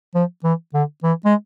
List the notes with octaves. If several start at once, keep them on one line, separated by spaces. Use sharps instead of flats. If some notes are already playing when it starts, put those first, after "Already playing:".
F3
E3
D3
E3
G#3